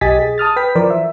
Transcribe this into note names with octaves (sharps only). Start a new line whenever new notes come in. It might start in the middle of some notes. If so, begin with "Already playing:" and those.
B1 G4 D#5 G#5 A6 B6
G#4
A5 D#6 F6 A6
B4 G5 B6
E3 F3 A#4 C5 D5
E5